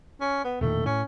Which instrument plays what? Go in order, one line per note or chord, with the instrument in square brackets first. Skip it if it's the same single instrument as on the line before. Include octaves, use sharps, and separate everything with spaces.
[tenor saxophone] C#4
B3
[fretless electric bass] E1 A#2 D#3 [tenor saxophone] A3
[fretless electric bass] A2 [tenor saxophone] C#4